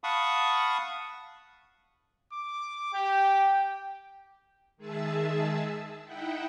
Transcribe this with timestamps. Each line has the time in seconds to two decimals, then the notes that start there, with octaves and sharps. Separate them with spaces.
0.04 F5 F#5 A5 B5 C#6 D#6
2.33 D6
2.94 G4 G5
4.77 D#3 G#3 G#4 E5 A5 E6
6.04 D#4 E4 E5 F#5 G5